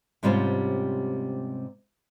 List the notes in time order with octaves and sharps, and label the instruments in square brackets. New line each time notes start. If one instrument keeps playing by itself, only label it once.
[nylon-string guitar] G#2 C3 G3 C#4 F4 C5